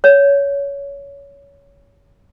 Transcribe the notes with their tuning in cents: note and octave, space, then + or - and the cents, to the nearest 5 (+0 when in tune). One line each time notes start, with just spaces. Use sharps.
C#5 +20